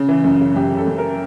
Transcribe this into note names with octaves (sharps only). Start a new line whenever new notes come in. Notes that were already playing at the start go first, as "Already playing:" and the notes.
Already playing: C#3
E3
F#2
C#3
F#2 G4
C#3
A4
F#2
A#4